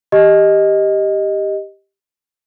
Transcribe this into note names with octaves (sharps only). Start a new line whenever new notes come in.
G4 D#5